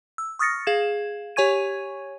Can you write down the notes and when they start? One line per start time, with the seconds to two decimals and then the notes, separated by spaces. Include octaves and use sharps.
0.18 E6
0.39 C#6 D#6 F6 A6 A#6 C#7
0.67 G#4 F5 G#6 E7
1.36 G4 C#5 G#5 C#6 G#6 D#7